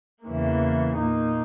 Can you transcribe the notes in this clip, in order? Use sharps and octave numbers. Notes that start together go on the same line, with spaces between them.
E2 C#3 E3 A#3
A#2 A#3 D#4